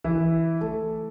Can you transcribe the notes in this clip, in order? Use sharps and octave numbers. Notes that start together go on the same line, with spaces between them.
E3 E4
A3 A4